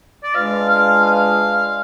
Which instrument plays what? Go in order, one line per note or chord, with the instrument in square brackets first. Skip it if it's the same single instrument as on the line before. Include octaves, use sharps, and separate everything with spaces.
[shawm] D5
[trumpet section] G#3 D4 F4 B4 [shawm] F5
[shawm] F5
F5